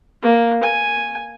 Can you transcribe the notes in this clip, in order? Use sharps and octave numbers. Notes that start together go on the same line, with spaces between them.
A#3
G#5